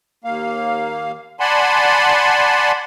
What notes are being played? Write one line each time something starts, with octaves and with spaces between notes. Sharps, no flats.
D#2 A#3 F5
D5 F#5 G#5 A5 B5 C6